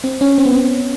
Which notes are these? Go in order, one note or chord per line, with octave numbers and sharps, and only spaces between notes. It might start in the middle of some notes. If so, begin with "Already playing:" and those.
C4
C#4
C4
B3
C4